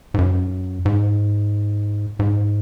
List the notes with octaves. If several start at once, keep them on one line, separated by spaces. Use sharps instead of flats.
G#2
F#2
G#2
G#2